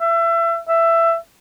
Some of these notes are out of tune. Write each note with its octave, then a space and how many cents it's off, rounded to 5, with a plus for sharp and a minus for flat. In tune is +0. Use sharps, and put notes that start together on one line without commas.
E5 +30
E5 +15